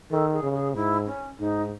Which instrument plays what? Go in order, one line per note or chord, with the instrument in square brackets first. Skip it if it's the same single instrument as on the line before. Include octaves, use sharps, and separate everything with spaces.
[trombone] D#3 [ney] A4
[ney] G#4
[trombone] C#3
[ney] G#4
[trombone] G#2 [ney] E4
[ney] C#4
[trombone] G#2 [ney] D#4